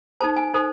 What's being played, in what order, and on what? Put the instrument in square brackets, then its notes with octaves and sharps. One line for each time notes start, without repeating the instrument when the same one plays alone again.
[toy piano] D#4 A4 C5 A5
G#5
D#4 A4 C5